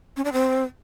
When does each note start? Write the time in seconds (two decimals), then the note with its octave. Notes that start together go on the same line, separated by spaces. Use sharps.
0.17 C#4
0.25 D4
0.33 C4